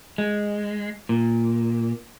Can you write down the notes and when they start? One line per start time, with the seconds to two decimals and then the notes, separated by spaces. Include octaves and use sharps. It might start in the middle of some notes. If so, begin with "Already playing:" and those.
0.18 G#3
1.09 A#2